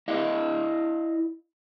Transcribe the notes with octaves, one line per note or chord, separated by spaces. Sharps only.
E4 D5 D#5 F5